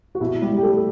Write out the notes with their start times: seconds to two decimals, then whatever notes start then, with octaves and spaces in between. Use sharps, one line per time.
0.15 F#4
0.21 B2 E4
0.42 G3 G4
0.52 G3 G4
0.63 A3 A4